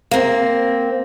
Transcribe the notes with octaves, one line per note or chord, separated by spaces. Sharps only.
A#3 C4